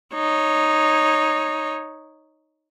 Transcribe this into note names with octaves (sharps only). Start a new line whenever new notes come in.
D#4 C#5